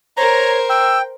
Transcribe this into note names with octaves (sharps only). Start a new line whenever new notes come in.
A#4 C5 C#5 A#5
G5 E6